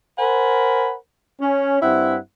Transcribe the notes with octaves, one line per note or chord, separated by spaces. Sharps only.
A#4 C5 F#5 G#5 B5
C#4
G2 C4 E4 E5 F#5